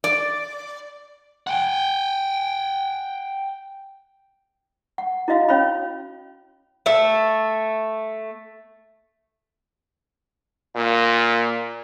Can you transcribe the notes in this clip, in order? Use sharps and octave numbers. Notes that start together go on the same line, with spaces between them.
D5
F#5 G5
F#5
E4 F#4 D#5 F5
C#4 C#5 F5 B5
A3 E5
A#2